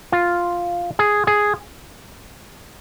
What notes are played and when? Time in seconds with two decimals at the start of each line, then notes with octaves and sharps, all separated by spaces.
0.12 F4
0.99 G#4
1.27 G#4